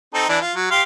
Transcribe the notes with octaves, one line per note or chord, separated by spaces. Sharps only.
C4 D#4 A4
E3 D4
F4
F#3
G4 F5 C6